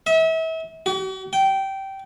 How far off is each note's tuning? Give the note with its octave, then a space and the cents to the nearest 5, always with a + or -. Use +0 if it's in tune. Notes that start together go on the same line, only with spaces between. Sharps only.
E5 -35
F#4 +45
G5 -15